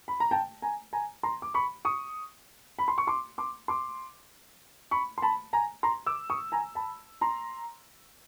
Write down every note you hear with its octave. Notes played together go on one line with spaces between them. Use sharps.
B5
A#5
G5 A5
G#5 A#5
G#5 A#5
A#5 C6
D6
B5 C#6
C#6 D#6
B5
C6
C#6
C6 D6
C6 D6
C6 D6
B5 C#6
C6
A5 B5
G#5 A#5
A#5 C6
D6 E6
C#6 D#6
G#5 A#5
A5 B5
A#5 C6